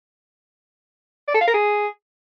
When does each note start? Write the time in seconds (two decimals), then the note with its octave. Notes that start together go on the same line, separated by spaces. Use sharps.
1.28 D5
1.34 A4
1.41 F5
1.47 A#4
1.54 G#4